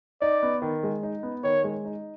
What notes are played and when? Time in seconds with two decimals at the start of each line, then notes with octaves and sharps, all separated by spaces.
0.21 D#4 D5
0.43 B3
0.62 D#3
0.83 G#3
1.03 D#4
1.23 B3
1.44 D#3 C#5
1.64 G#3
1.85 D#4